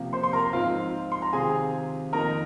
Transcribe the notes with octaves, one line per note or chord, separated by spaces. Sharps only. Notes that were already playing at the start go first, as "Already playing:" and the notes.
Already playing: C3 F3 A#3
C5 C6
C6
A#4 A#5
G#2 F3 C4 F4 F5
C6
A#5
C3 D#3 C4 F4 G#4 G#5
F2 D#3 A#3 D#4 A#4 A#5